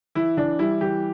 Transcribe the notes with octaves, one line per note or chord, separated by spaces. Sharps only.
E3 E4
E3 D4
G3 E4
E3 G4